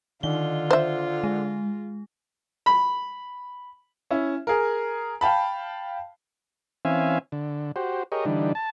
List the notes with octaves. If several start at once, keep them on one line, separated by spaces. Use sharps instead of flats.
D3 D#3 F4 G7
C5 E5
G#3
B5
C#4 E4
G#4 A#4
F5 G5 A5 B5
E3 C4 C#4 E5 F5 G#5
D3
F#4 G4 C5
G4 G#4 A#4 C#5 D#5
D3 E3 G3 D4 D#4
A5